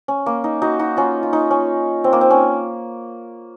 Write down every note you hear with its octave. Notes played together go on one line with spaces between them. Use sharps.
C#4
A#3
D#4
D#4 F#4
D#4 F#4
C#4 F4
F4
D#4
C#4
C4
A#3
C4
C#4